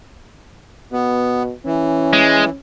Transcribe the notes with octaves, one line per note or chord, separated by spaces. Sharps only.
B2 B3
E3 C#4
G#3